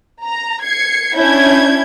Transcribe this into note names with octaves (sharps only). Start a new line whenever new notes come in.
A#5
G#6 C7 C#7
C#4 D4 E4 G6 G#6